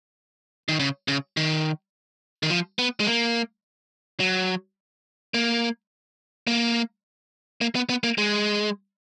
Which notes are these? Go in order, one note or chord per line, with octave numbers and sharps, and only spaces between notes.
D#3
C#3
C#3
D#3
D#3
F3
B3
G#3
A#3
F#3
A#3
A#3
A#3
B3
B3
A#3
G#3